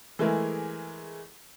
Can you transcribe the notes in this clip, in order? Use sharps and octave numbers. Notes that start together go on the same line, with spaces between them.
E3 G#3 A3 G#4 A#4